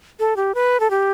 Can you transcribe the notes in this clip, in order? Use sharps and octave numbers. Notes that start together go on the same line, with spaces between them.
A4
G4
B4
A4
G4